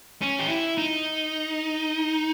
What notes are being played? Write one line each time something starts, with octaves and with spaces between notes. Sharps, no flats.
C#4
G4
E4
D#4